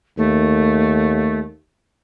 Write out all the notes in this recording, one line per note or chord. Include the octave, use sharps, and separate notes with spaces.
D#2 A3